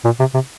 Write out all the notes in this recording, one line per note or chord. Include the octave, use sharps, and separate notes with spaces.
A#2
C3
C3